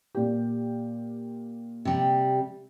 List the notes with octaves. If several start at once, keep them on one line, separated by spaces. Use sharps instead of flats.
A#2 G4
C3 G3